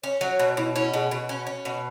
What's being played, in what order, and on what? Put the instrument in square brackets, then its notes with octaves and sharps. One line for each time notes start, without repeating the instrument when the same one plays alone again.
[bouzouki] C#4 [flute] C#5
[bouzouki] F#3
[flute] C#5
[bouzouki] B2
[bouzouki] B2 [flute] E4
[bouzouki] C#4 [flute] E4
[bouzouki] B2 [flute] G#4
[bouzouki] B2 [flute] F#4
[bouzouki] C#4
C#4
B2